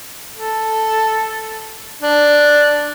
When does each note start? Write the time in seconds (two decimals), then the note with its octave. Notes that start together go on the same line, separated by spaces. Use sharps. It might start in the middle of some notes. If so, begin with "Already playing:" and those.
0.34 A4
2.02 D4